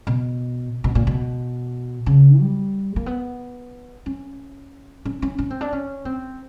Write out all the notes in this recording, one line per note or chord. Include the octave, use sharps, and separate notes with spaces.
B2
B2
A#2
B2
C#3
G3
A#3
B3
C#4
C#4
C#4
C#4
C4
D4
C#4
C4